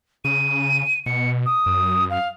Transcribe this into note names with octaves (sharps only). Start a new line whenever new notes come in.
C#3 D#7
B2 C#7
D#6
F#2
F5